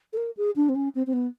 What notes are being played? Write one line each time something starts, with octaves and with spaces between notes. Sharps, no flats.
A4
A#4
G#4
D4
C4
C#4
C4
C4
B3